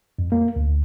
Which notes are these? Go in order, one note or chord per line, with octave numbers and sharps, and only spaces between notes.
F2
A#3
D2